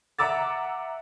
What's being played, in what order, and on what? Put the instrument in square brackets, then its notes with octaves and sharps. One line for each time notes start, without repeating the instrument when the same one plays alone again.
[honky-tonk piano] E5 F#5 A#5 D6 E6 A6